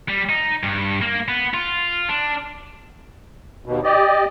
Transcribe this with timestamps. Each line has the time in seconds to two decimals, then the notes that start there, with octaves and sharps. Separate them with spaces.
0.09 G3
0.29 D#4
0.64 G2
1.02 A#3
1.28 B3
1.54 F4
2.09 D4
3.65 D#2 B2
3.84 G4 D5 D#5